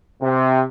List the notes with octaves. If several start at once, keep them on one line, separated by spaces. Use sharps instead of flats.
C3